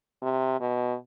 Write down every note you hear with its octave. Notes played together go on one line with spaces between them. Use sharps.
C3
B2